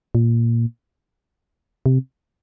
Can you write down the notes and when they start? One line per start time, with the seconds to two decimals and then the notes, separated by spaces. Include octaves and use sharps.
0.15 A#2
1.86 C3